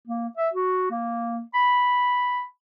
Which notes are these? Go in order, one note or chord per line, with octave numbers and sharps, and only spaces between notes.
A#3
E5
F#4
A#3
B5